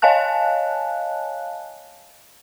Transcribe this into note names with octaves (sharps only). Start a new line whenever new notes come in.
C#5 D#5 F5 G#5 A5 F#6